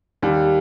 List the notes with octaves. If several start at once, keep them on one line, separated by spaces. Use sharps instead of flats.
D#2 G3